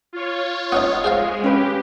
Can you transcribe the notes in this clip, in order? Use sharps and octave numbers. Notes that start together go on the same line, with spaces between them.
F4 C#5
B3 C#4 D#4
G#3 G#4 C5 F5
C#4 G4 B4